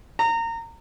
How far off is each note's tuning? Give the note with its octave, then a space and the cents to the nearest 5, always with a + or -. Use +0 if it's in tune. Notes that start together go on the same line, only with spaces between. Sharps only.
A#5 -25